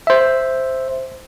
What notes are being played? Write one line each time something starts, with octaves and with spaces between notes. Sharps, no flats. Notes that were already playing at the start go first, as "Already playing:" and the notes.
C5 E5